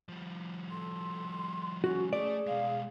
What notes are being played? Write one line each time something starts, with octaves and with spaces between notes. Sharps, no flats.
F3 G3
A4 C6
C#4 F#4 C#6
A3 G#4 D5
B2 G#3 F5